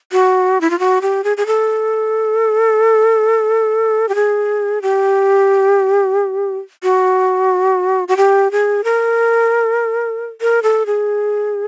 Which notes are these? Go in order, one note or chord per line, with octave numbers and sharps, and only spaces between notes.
F#4
E4
F4
F#4
G4
G#4
G#4
A4
G4
G#4
G4
F#4
F#4
G4
G#4
A#4
A#4
A4
G#4